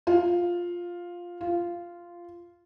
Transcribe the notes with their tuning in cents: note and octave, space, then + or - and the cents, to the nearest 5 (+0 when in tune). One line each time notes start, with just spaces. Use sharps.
F4 +5
F4 -10